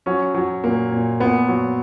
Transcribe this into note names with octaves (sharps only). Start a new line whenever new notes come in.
F#3 C#4
F#3
A#2 A#3
A#2
A#2 B3
F#3